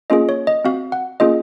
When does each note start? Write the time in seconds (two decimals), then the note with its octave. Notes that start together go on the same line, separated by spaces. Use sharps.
0.10 A#3 C#4 F4 G#4 D#5
0.29 C#5
0.47 D#5
0.65 C4 F#4 F5
0.92 F#5
1.20 A#3 C#4 F4 G#4 D#5